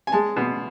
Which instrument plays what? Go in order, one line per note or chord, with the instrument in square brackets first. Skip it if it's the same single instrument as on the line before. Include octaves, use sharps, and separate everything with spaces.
[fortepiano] G#5
G#3 A5
B2